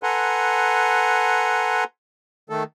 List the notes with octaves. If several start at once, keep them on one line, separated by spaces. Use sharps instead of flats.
A4 B4 F#5 G#5 A#5 C6
D#3 A3 A4